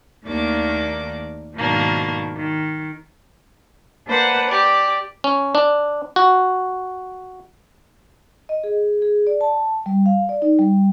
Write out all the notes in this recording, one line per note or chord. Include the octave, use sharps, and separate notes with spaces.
D#2 D#3 A3 A#3 D4 D6
G#2 B2 D#3 F3 A#3 D4
D#3
A#3 D4 B4 C5 F#5
G4 D5
C#4
D4
F#4
D#5
G#4
G#4
D5
A5
G3
F5
D5
D#4
G3